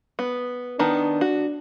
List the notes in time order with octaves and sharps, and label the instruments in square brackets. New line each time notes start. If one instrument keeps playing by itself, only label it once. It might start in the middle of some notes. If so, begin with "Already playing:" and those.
[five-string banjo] B3
[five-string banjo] D#3 B3 A5 [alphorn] D4
[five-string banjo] F#4